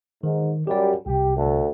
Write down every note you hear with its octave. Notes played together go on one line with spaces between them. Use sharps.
G#2 D#3
F#2 G3 G4 D5
C2 C3 G4
D2 A3 A4